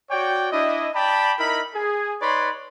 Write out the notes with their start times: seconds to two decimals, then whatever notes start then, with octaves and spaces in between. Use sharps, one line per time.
0.11 F#4 C#5 D5 G5
0.52 D4 E4 D#5
0.95 D5 G5 A5 B5
1.39 D#4 E4 A#4 B5
1.74 G#4
2.21 D#4 B4 C#5 D5 B5 C6